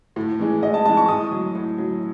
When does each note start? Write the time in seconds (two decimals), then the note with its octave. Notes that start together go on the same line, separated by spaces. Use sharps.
0.16 A2
0.39 E3 G#3
0.62 A2 D#5
0.74 A5
0.85 E3 G#3 A5
0.97 C#6
1.08 A2 D#6
1.32 F#3
1.55 A2
1.78 F#3